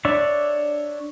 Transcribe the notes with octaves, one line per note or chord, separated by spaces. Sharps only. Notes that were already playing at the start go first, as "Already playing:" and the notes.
D4 C#5 D5 E5